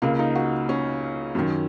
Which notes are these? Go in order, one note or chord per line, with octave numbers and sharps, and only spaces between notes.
C#2 C#3 A#3
D#4
F#4
C#4
F#2 D#3